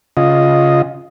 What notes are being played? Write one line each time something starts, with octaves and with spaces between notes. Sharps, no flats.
C#3 F4 D#5